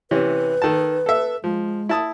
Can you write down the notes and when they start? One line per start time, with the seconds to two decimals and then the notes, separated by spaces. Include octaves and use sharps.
0.11 C3 E3 C#4 B4
0.62 D#3 A4 A5
1.06 A4 E5
1.44 F3 G#3
1.89 E4 A5 D#6